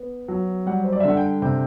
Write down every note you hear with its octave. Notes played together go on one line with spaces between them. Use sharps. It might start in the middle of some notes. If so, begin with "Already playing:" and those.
Already playing: B3
F#3
G3 F#5
C5
D5
E5
D3 F#5
G5
C3 G5